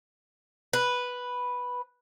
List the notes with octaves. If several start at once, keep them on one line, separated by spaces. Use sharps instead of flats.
B4